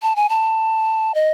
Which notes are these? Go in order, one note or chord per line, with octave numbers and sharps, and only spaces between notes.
A5
G#5
A5
D#5